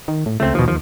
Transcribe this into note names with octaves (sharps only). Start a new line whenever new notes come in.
D#3
A2
C#2 A3 C4
D#2 B2 F3
D#2 F3